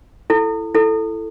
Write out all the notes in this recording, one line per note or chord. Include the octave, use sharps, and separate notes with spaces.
E4 A4
E4 A4